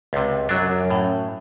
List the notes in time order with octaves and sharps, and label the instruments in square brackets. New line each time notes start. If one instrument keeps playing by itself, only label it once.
[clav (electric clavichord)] C#2 C3
[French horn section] F#2 [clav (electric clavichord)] F#3 D4
[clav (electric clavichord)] A2